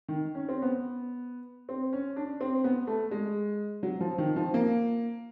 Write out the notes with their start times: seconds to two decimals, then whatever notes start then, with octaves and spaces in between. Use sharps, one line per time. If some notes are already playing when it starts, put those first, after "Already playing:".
0.08 D#3
0.35 C#4
0.49 C4
0.62 B3
1.69 C4
1.93 C#4
2.16 D4
2.41 C4
2.64 B3
2.87 A3
3.11 G#3
3.83 F#3
4.01 F3
4.18 D#3
4.36 F3
4.54 A#3